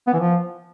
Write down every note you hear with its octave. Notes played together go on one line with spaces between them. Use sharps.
B3
E3
F3